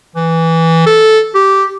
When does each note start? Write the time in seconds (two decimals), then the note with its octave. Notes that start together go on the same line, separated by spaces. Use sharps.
0.16 E3
0.87 A4
1.35 G4